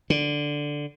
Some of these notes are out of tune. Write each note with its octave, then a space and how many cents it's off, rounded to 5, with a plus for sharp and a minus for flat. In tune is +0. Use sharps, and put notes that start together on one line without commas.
D3 +0